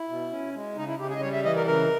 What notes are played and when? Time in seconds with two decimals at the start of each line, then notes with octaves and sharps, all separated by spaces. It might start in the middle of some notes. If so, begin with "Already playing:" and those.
Already playing: E4
0.09 B2
0.31 C#4
0.54 G#3
0.76 C#3 D#4
0.88 E4
0.99 C#3 G4
1.10 G#4
1.15 D#5
1.21 G3 C#5
1.33 E5
1.43 E3 D#5
1.56 A#4
1.67 C#3 A#4